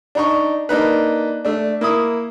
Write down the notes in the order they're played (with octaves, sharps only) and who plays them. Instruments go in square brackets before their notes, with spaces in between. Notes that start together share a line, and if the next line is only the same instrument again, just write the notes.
[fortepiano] D4 D#4 C#6
A#3 D4 D#4 B4
A3 D4
A#3 E4 D#6